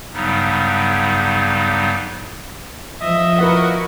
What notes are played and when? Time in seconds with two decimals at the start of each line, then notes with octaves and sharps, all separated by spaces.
0.13 G2 C#3 F#3 G3 B3 D#4
3.01 F3 D#5 E5 D#6
3.39 E4 F#4 A#4 B4 F#5